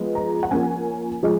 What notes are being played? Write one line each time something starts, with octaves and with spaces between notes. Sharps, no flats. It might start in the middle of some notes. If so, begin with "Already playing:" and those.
Already playing: F3 G#3 B3
A#5
F#5
F3 A#3 C#4 G#5
F3 G#3